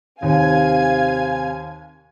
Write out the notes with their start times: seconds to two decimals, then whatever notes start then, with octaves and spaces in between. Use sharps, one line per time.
0.22 D#2 C3 F5 G#5 G#6